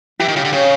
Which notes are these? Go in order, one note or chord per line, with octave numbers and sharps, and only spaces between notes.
E3 G4
D#3
C#3 G4
D3
C#3 C#5